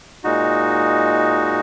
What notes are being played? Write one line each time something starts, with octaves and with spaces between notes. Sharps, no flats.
A#2 G#3 D#4 F#4